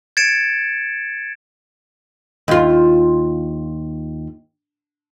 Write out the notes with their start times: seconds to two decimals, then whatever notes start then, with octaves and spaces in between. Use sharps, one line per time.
0.17 G#6 A6 C#7 D7 E7
2.48 D#2 F4